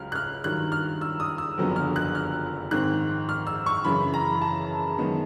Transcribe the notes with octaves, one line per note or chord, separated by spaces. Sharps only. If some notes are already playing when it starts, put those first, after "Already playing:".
Already playing: C#2 C#3 F#3 F6
F#6
F6
G2 D#3 F#3 F#6
F6
E6
D#6
E6
F#1 F2 D3 F#3 B3
F6
F#6
F6
G#2 D#3 G#3 C4 F#6
F6
E6
C#6
F#2 C#3 E3 B5
A#5
A5
F#2 D#3 G#3 B3